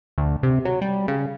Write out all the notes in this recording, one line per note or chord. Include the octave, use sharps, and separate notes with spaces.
D2
C3
F#3
G3
C#3